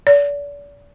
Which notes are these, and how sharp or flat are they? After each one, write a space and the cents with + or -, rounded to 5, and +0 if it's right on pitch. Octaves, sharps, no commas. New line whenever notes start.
D5 -40